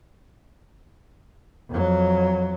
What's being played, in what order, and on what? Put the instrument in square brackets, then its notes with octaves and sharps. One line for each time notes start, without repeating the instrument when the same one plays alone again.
[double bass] F2 F#3